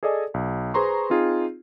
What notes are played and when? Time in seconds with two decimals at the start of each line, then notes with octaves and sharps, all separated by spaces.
0.03 G#4 A4 D5 D#5 G#5
0.34 B1
0.74 G#4 B4 C5 A#5 C6 C#6
1.10 C4 D#4 F4 G#4